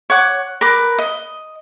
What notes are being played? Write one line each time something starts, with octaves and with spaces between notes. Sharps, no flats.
C#5 F#5 D6
A#4 B4 D6
D#5